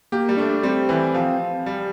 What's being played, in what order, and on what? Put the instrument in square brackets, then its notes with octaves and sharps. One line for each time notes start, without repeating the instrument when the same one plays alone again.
[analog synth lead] A#3 [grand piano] G4
[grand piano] G3
[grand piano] A3 [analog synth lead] D4
[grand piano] G3 [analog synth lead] C4
[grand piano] E3
F3
G3